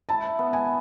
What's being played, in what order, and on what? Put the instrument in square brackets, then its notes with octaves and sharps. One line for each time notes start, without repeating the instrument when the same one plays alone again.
[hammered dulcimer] E4 [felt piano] A5
[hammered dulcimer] B3
[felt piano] G#5